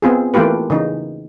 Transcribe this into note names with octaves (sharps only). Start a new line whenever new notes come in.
B3 C4 F4 G#4
E3 A3 A#3 F4 G4 B4
C#3 E3 D#4